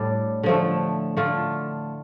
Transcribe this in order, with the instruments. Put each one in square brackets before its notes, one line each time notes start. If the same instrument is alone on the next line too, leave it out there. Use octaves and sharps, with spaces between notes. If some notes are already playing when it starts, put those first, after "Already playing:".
Already playing: [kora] A2 G3 D4
D3 F3 A3
D3 A3 F4